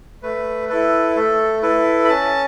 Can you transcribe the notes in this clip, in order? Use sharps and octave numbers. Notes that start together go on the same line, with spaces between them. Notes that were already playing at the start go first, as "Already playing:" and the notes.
A3 B4
E4 A4 B4
A3 A4
E4 A4 B4
B5
C#4 A5